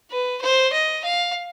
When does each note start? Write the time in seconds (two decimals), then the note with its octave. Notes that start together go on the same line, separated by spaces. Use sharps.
0.11 B4
0.42 C5
0.73 D#5
1.04 F5